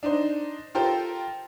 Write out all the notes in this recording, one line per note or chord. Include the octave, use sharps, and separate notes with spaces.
D4 D#4 C5
F4 G4 A4 A#4 C5 G5